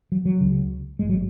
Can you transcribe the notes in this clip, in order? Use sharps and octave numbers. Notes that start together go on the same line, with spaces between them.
F#3
F#3
C#2 C#3
G#1 G#2 G#3
F#3